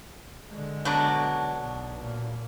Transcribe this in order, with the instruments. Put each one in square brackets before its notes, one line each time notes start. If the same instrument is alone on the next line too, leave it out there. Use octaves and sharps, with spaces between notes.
[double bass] D3 G#3
[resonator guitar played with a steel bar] B2 F#3 D4
[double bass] B1
A#2